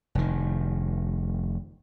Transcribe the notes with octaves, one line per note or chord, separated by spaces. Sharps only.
F1 D#3